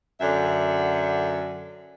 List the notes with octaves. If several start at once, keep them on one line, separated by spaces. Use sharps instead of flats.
F#2 D3 E5